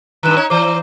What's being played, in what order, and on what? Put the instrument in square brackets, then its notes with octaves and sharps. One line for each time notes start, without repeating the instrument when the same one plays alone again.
[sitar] G2 D#3 [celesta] A#5 F#6 E7
[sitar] D#4 C#5
[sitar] E3 C5 [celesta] D5 A#5 D6